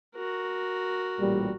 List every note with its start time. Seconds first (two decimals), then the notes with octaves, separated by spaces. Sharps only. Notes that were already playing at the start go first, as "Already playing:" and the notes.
0.15 F#4 A#4
1.19 A1 A#2 G3